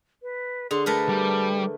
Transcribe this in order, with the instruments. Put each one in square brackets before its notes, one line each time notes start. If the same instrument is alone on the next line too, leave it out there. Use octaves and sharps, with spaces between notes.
[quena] B4
[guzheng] D3 [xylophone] G#4 [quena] C6
[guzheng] A3 A#4 B4 [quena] A5
[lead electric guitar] G3